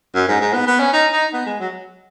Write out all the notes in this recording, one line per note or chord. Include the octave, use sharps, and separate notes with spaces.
F#2
G#2
G#2
B3
B3
C#4
D#4
D#4
B3
G#3
F#3